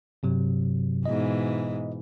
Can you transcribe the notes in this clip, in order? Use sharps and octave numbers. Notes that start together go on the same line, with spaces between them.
G2 C3 F#3
G#2 B2 E3 D#5